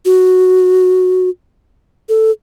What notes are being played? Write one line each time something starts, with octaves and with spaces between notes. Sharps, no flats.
F#4
A4